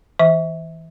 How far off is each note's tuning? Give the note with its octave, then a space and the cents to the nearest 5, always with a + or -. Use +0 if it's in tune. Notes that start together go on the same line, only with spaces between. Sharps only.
E3 -20 E5 -25